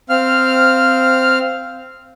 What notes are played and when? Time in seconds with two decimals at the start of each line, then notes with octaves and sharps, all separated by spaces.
0.09 C4 F5 F6